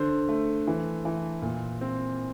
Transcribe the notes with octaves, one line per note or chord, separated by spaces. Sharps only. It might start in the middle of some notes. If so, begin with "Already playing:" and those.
Already playing: D3 C5
A3
E3
E3
A#2
C4